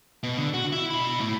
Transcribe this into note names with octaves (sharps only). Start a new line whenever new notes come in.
B2
D3
F#4
E4
B2 B5
A2 E4